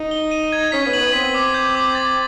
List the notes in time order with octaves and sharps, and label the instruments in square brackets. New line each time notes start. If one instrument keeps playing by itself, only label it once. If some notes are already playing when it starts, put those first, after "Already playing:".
Already playing: [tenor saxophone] D#4
[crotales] G7
D#7
G#6
[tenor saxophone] C#4 [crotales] B6
[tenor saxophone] B3
[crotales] F#7
[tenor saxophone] B3
[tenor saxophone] C4 [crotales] B6
[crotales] D6
G6
D6
A6